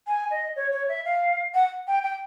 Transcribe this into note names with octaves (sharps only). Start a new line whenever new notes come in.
G#5
D#5
C#5
C#5
E5
F5
F#5
G5
G5